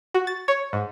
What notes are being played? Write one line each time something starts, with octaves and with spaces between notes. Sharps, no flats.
F#4
A6
C#5
G#2